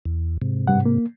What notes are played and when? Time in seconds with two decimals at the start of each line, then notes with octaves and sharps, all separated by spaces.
0.05 E2
0.42 G#2 C3
0.67 G2 G3 F#5
0.86 A#3